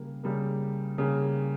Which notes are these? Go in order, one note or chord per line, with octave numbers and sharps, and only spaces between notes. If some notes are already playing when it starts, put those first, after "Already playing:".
Already playing: C#3 G3 A#3
C#3 G3 A#3
C#3 G3 A#3